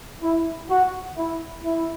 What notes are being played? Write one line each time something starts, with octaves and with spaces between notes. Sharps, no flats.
E4
F#4
E4
E4